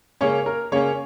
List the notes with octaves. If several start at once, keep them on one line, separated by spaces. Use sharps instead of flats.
C#3 A#3 C#4 C#5
A#4
C#3 A#3 C#4 C#5